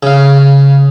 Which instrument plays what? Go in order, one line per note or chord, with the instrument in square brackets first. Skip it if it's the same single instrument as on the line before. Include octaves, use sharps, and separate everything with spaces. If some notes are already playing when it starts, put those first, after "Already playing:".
[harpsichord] C#3 F5